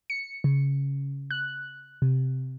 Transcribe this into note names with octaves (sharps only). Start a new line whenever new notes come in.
C#7
C#3
F#6
C3